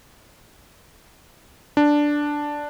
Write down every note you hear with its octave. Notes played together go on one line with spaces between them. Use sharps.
D4